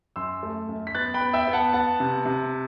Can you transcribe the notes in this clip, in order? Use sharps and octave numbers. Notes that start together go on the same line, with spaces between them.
F#2 C6 E6
A3
F#2
B6
B3 F#6 A6
G5 B5
B3
E5 G5
B3
F#5 A5
B3 F#5 A5
C3
C3